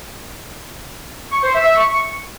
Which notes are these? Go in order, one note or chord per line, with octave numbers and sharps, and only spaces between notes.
C#6
C5
E5
E5
C#6